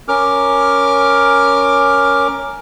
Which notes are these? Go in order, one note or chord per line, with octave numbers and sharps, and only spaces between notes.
C#4 A#4 D6 F6